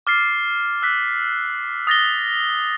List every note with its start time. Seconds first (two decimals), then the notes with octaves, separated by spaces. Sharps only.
0.07 D6 F6 A6 C7
0.82 E6 F#6 B6
1.87 D#6 A6 A#6 G7